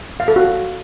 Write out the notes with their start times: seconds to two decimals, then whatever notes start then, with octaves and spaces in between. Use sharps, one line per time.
0.20 F5
0.28 A4
0.36 F#4